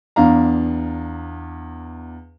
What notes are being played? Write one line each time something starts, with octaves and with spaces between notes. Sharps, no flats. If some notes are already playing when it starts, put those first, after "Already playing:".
E2 D4 F5 A#5